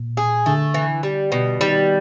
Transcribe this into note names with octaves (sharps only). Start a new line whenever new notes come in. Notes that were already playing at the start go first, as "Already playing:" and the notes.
Already playing: A#2
G#4
D3 A3
E3
G3
B2
D#3 G3